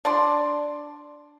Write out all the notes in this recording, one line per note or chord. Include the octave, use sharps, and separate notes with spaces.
D4 D5 C6